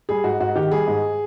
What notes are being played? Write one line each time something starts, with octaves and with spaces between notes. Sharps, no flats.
G3 G#4
G#2 F#4
G#2 F#4
D#3 G4
G3 G#4
G#2